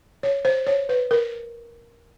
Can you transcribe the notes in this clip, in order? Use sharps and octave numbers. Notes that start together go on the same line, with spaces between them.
C#5
C5
C#5
B4
A#4